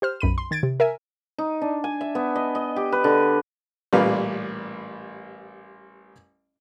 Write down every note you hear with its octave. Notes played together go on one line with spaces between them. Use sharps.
G4 C5 F6
B1 F#2 B5 D#7
C6
D#3 G#6 A6 D7
C3
A#4 E5 G#5
D#4
D4
G#5
E5
B3
D#5
D#5
G4
B4
D3
A1 A#2 G3 B4 F5